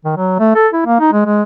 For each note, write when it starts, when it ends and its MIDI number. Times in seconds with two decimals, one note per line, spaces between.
0.05 0.14 51
0.17 0.38 54
0.39 0.53 57
0.55 0.68 69
0.73 0.84 64
0.86 0.98 58
1.00 1.12 63
1.12 1.25 56
1.25 1.42 56